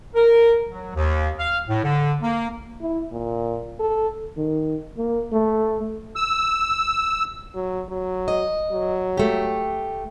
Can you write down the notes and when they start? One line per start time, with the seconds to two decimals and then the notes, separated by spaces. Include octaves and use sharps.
0.15 A#4
0.69 F#3
0.95 D#2
1.39 F5
1.69 A2
1.84 D3
2.23 A#3
2.81 E4
3.12 A#2
3.80 A4
4.37 D#3
4.98 A#3
5.33 A3
6.16 E6
7.55 F#3
7.89 F#3
8.28 D#5
8.72 F#3
9.17 A3 G4